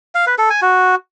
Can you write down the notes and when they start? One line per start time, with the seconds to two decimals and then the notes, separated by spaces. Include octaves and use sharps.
0.15 F5
0.27 B4
0.38 A4
0.50 G#5
0.62 F#4